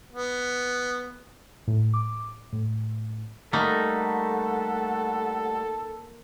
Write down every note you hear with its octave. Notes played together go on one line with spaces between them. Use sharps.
B3
A2
D6
A2
G3 A3 A#3 D#4 A4 F#5